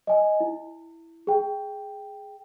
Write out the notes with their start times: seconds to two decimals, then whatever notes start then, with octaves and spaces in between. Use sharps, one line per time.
0.07 D#5 G#5
0.40 E4
1.27 G#4 G5